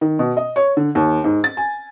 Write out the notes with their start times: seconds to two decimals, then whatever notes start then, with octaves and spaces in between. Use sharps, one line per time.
0.01 D#3
0.19 B2
0.37 D#5
0.56 C#5
0.77 D3
0.95 D#2
1.24 G#2
1.44 A6
1.57 G#5